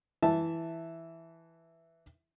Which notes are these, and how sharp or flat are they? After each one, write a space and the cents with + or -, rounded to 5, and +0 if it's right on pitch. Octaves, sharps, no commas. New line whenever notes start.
E3 +0 E5 +0 A5 +0